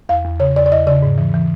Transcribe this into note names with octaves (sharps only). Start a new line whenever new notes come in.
E2 F5
E2
C#3 C#5
E2 D5
D5
E2 D#5
C#3 D5
G#2
E3
E3